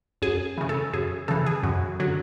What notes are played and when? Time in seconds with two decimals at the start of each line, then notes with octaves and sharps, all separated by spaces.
0.22 F#2 G#4
0.58 C#3 E3
0.69 A4
0.93 F#2 G#4
1.28 C#3 E3 A4
1.46 G#4
1.63 F#2 F#4
1.99 D3 F#3